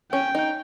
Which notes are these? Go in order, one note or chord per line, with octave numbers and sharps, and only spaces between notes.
C#4 G5
D#4